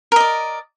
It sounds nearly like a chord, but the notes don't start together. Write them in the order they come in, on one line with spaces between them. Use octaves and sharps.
A#4 D#5 D5